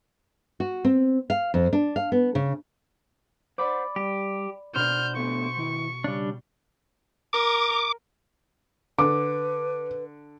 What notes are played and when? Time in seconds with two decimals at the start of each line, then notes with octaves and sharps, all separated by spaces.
0.60 F#4
0.85 C4
1.30 F5
1.54 F2
1.73 D4
1.96 F5
2.12 B3
2.35 C#3
3.58 C5 D5 F#5 B5 D6
3.96 G3 G4
4.76 B2 D4 C5 D5 F6 G6
5.16 A3 B3 D4 C#6
5.57 D#3 E4
6.04 C#3 G3 D4
7.33 A#4 D6
8.99 D3 B4 D6